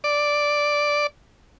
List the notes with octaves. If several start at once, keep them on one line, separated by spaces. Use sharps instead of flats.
D5